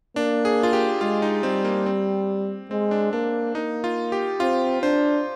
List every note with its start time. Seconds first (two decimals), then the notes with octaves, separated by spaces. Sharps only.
0.16 A#3 D4
0.45 G#4
0.63 F4
0.73 G4
1.01 G#3 F4
1.22 D#4
1.43 G3 C4
1.65 A#3
1.86 C4
2.71 G#3 C4
2.91 D4
3.13 A#3 D4
3.55 A#3 D#4
3.84 F4
4.12 G4
4.40 C4 F4
4.83 D4 C5